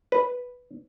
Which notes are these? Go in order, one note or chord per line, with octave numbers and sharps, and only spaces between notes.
B4